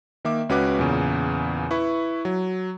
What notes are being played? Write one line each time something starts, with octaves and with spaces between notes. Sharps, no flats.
D#3 A#3 E5 D6
C#2 C#4 F#4 B4 D6 F#6
E2 A#2 C#3
E4 B4 C#6
F#3